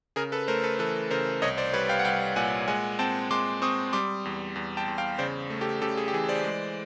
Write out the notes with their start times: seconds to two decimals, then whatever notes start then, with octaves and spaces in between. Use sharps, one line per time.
0.16 C#3 G#4 A#4
0.32 A4 B4
0.48 A3 A#4 C5
0.63 A4 B4
0.79 E3 A4 B4
1.10 C#3 A#4 C5
1.42 C2 C#5 D#5
1.58 C5 D5
1.74 G3 B4 C#5
1.89 F5 G5
1.99 F#5
2.05 C2 F5 G5
2.36 A#2 F#5 G#5
2.68 G#3 F#5 G#5
2.99 C4 G5 A5
3.31 G#3 C6 D6
3.62 C4 C#6 D#6
3.93 G3 C6 D6
4.25 E2
4.56 E2
4.77 G5 A5
4.88 E2
4.98 F5 G5
5.18 C#3 C5 D5
5.50 A3
5.61 G4 A4
5.82 C#3 G4 A4
5.97 G#4
6.08 G4
6.13 E3 G#4
6.28 C5 D5
6.44 G#3